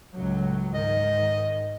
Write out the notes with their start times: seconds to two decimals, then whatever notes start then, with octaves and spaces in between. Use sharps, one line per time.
0.14 C#2 A2 F#3
0.74 G#2 D#3 D#5